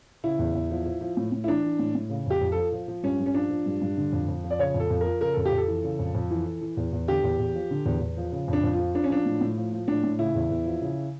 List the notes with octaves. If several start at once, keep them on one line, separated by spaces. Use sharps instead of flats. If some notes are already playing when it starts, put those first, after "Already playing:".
C#3 E4
E2
E2
F3
F3
F3
A2
A2
E4
E3 D4
E3
A2
A2
C#3
F2 G4
F2
F3 A4
F3
F3
G2 C#4
G2
C#4
F3 D4
F3
G2
G2
D3
F2
F2
F3
D5
C#3 C#5
F2
A4
F2
A#4
F3
C#3 A#4
F2 A4
G4
F2
A4
E3
C#3
F2
F2
E3
E3
E3
E2
E2
D3 G4
E2
E2
F3
D3
E2
E2
F3
C#3
F2 D4
F2
F4
F3
F3 D4
C#4
F3 D4
A2
A2
F3
F3
A2 D4
A2
C#3 E4
E2
E2
F3
C#3